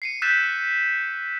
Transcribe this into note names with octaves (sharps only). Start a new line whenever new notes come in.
C7 C#7 D#7
E6 F#6 G6 A6 B6 E7